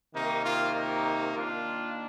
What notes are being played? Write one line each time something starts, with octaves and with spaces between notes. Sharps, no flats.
C3 D#3 A#3 D#4
F4
D#4
D#3 A#3 D4 F4